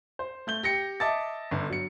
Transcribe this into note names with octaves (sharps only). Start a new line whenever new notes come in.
C5
A3 G6 G7
G4 A#6 C#7
D#5 E5 A5 D6 A6
G1 D3
F#3 C#7